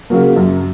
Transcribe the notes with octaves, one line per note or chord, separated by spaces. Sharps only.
C#3 F#3 A#3
F#2